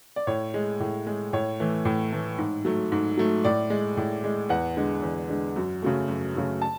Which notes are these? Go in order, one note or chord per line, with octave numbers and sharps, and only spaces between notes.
D5
A2 C#5
G#3
A2
G#3
A2 C#5
E3 A3
A2
E3 A3
G#2
F#3 A3
G#2
F#3 A3
A2 D5
G#3
A2
G#3
E2 F#5
D3 G#3
E2
D3 G#3
F#2
C#3 F#3 A3
F#2
C#3 F#3 A3
A5